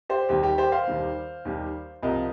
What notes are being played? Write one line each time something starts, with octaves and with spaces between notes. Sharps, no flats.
G4 C5
D#2 D#3 G3 G4
G4
G4 C5
C5 F5
D#2 D#3 G3
D#2 D#3 G3
C2 A#2 F3 A#4 D#5